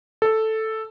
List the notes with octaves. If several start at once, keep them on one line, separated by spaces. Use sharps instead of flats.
A4